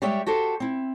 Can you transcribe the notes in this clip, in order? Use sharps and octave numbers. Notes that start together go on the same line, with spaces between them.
G3 G#3 G4 C#5 E5 G5
F#4 G4 A4 C5
C4 E4